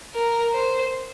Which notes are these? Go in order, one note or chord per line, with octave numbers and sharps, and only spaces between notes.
A#4
C5